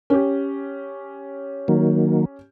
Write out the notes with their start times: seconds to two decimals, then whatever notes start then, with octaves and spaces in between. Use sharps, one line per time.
0.10 C#4 G4
1.68 D#3 F#3 A#3